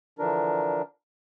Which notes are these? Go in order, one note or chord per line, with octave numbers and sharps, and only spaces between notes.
D3 E3 F3 D4 A#4